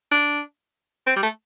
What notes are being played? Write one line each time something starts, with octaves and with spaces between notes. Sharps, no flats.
D4
C4
G3
A3